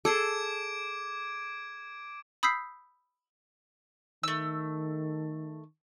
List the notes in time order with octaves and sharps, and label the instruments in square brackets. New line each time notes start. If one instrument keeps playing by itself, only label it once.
[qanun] G#4 A4 [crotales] D6 G#6 D7
[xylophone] B5 D#6 E6 G6 B6 C7
[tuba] D#3 [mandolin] A3 E6